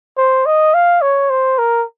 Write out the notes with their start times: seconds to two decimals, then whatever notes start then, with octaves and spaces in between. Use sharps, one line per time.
0.18 C5
0.46 D#5
0.74 F5
1.02 C#5
1.30 C5
1.58 A#4